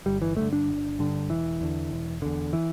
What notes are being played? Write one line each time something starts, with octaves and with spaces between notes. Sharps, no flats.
G1 G3
E3
G2 D3 A3
D4
G1
G2 D3
E1 E3
E2 D3
E1
E2 D3
E3